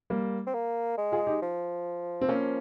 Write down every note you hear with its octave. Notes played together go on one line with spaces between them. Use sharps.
G3 A#3
C4
A#3
G#3
F4 G#4
D#4 G4
F3
C4
A#3 C#4